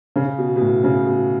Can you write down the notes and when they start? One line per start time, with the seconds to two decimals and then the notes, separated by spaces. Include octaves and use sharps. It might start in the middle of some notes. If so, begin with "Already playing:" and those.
0.16 C#3
0.38 B2
0.56 B2
0.61 A2
0.84 C#3
1.06 B2